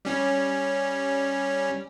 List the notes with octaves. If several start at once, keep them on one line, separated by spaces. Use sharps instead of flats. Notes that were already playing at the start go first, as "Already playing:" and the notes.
G3 C#4